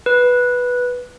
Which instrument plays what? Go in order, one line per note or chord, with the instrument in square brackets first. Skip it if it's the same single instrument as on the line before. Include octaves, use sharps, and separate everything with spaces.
[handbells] B4